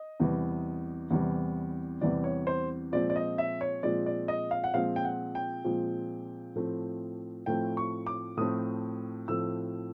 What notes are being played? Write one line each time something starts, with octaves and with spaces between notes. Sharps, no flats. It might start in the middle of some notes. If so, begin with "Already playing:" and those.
Already playing: D#5
E2 C3 E3 G3
E2 C3 E3 G3
E2 C3 E3 G3 D5
C#5
C5
A#2 F3 G#3 C4 D5
D5
D#5
E5
C#5
A#2 F3 G#3 C4 D5
D5
D#5
F5
F#5
A#2 F3 G#3 C4 F5
G5
F#5
G5
A#2 F3 G#3 C4
A2 F3 A3 C4
A2 F3 A3 C4 G5
C#6
D6
A2 F3 A3 C4 D#6
A2 F3 A3 C4 E6